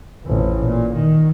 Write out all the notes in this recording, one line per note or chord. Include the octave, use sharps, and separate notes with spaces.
A1 F2
A#2
D#3